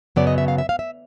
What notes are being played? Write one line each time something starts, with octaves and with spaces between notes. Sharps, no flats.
F#2 C#3 F#3 B3 D5
D#5
E5
F5
E5
F5
E5